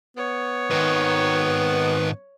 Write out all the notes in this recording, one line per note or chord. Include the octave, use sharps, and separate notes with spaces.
B3 C#5
G#2 D#3 B4